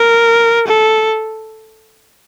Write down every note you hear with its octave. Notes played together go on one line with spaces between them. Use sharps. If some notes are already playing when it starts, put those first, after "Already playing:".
Already playing: A#4
A4